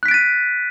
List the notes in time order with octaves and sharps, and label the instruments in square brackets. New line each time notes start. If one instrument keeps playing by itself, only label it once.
[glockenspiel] F#6
B6
D7
A6
D#7